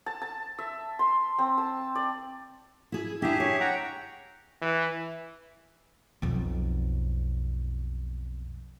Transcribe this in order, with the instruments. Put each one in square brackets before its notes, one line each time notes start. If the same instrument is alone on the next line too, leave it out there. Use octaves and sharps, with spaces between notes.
[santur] A5
A5
E5
C6
C4
A5
D5
[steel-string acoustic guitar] E4 G#4
[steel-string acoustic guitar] D4 E4 [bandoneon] G4 G#4 E5
[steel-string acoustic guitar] C#5
[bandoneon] F#5 G5 A#5
[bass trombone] E3
[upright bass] B1 F2